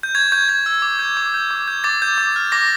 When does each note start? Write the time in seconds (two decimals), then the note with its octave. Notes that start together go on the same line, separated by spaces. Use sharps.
0.03 G6
0.15 C#6 G#6
0.32 C#6 G6
0.48 G6 G#6
0.66 E6
0.82 D6
0.99 G6
1.17 D6
1.34 G6
1.51 D6
1.68 G6
1.84 D6 A6
2.02 G6
2.18 D6
2.36 F6
2.52 D6 A#6